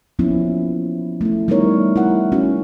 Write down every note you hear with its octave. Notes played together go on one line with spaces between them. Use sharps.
F3 A#3 B3 C#4 E4
A3 E4
G3 B3 D#4 E4 A#4 C#5
E4 A#4 F#5
C#4 F#4